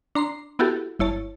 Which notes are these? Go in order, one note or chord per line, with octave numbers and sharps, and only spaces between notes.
D4 A#5 C6 C7
B3 E4 F#4 G4 A4
G1 E4 C#5 A5